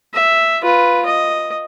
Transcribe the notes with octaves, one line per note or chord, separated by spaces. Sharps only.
E5
F4 B4
D#5